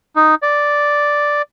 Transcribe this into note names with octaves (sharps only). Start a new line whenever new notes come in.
D#4
D5